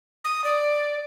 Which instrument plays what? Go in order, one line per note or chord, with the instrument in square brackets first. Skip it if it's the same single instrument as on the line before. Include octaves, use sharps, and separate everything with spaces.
[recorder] D#6
D5